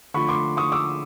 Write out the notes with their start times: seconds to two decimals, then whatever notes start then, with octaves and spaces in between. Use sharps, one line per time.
0.14 D3 F3 A3 B5 C#6
0.29 C6 D6
0.57 C#6 D#6
0.72 D6 E6